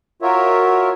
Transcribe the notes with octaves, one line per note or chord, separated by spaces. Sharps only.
F4 F#4 A#4 C#5 E5